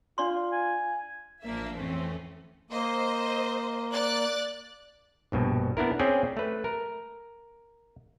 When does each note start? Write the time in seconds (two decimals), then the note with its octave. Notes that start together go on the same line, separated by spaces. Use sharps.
0.18 D4 F4 D5 C6
0.52 G#5
1.43 A1 F3 A#3 D4 E5
1.76 F2 A2 E3 A3 C4 C#4
2.71 A#3 C5 D#5
3.92 D5 F#6 A6
5.32 A#1 G2 B2
5.77 B3 D4 E4 A#4
5.99 C4 C#4 G#4 C#5 D5 G5
6.37 A3 B4
6.64 A#4